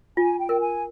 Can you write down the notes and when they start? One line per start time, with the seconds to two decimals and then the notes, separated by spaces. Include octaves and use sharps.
0.17 F4 G#5
0.39 G5
0.49 A#4
0.60 G#5